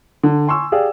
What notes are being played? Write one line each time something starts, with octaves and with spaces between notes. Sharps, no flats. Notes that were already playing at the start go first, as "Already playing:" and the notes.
D3
G#5 C6 C#6 E6
G4 G#4 D5 F5